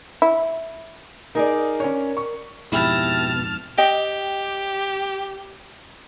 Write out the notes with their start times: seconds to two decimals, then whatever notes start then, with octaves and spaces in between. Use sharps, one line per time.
0.22 E4
1.35 D#4 G#4 A#4 D5
1.80 C#4 C#5
2.17 C#6
2.72 F2 G#2 B2 E4 G4 A5 A#5 F6
3.78 G4 D#5 G5